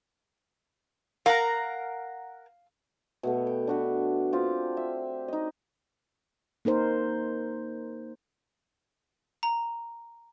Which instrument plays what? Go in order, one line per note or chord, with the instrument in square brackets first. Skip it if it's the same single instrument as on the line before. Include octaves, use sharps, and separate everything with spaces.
[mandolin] A#4 F#5 A#5 [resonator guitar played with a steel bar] F5
[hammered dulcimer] B2 A3 B3
G5
D4 F#4 B4
C4 F4 G4
E5
D#4 D#5
[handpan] A#3 D#4 A#4 C5
[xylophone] A#5